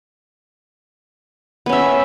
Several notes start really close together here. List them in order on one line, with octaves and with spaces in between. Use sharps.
B3 C#4 E5